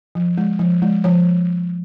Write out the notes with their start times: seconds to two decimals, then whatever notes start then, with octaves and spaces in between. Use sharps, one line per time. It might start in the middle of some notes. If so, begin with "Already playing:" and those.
0.15 F3
0.37 G#3
0.59 F3
0.82 G#3
1.04 F3 C#5